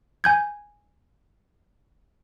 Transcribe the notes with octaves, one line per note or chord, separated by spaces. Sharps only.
G#5 G6 G#6